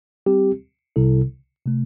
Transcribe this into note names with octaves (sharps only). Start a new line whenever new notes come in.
G3 C4 G4
C2 C3 G3 E4 A4
C3 A3